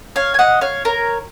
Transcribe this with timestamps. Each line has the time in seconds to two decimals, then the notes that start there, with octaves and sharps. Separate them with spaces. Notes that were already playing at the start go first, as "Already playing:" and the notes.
0.16 C#5 F5
0.34 G#5
0.39 D#5 F#5
0.61 C#5 F5
0.85 A#4 C#5